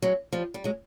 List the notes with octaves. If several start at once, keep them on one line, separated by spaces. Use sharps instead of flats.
F#3 G#3
F3 G3
G3
F#3 G#3